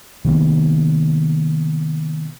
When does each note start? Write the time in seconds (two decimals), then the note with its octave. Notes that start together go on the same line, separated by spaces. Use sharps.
0.25 C3 D#3 A#3 B3